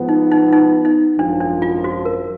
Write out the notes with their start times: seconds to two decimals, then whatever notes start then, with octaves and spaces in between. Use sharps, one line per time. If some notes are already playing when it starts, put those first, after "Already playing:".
Already playing: G#2 F3 B3
0.09 D#4
0.31 D#4
0.52 D#4
0.85 D#4
1.18 G#1 F#2 F3 D4
1.41 D4
1.62 F4
1.84 F#4
2.05 A#4